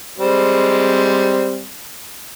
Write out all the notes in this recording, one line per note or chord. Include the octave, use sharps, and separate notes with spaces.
G3 G#3 C4